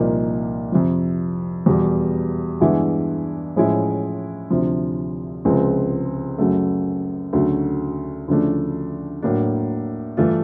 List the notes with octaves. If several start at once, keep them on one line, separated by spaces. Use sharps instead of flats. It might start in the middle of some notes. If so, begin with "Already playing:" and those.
Already playing: C2 A#2 F3 A#3 D#4
F2 C3 F3
E2 B2 G3
G2 E3 G#3 B3 E4
A2 F3 G#3 C#4 E4
D2 C3 F3
C#2 C3 F3 G#3 C4
F#2 C#3 F#3 A3
D2 C#3 F#3 A3
D2 C#3 F3 A3 D4
A2 F#3 A#3 D4
G2 E3 A3 D4 F4